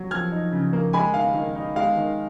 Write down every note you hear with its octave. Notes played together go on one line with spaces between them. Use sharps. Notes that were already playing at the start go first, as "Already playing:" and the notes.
Already playing: F#3
F3 F6 G#6
D#4
C#3
A#3
G#3 G#5 B5
D#3 F5
D#3
D#4
G#3 F5
D#3